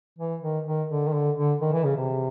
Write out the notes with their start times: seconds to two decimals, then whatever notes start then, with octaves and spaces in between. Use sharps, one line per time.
0.18 E3
0.42 D#3
0.66 D#3
0.89 D3
1.08 D#3
1.14 D3
1.37 D3
1.61 D#3
1.72 E3
1.84 C#3
1.97 C3